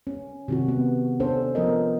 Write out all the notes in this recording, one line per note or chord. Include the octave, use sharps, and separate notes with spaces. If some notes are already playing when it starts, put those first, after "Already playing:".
C#4
C3 D#3 F#4
B3
C#4 D4 A4 C5
F3 B3 A#4 D#5